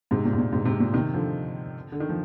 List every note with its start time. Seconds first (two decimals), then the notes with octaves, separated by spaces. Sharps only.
0.11 G#2 C3
0.25 A#2
0.33 G#2
0.38 A#2
0.53 G#2 C3
0.65 G#2 C3
0.80 A#2
0.94 C3 D#3
1.13 D3 F3
1.92 D3
2.00 D#3
2.09 F3